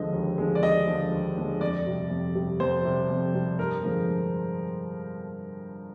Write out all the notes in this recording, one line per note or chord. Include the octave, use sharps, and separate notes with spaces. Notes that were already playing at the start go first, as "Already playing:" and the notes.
Already playing: D#2 D3 F3 G#3 D#5
D#2
D3 F3 G#3
D5
D#2 D#5
D3 F3 G#3
D#2
D3 F3 G#3
F2 D5
C3 G3
F2
C3 G3
F2 C5
C3 G3
F2
C3 G3
G2 A#4
D3 F3 G#3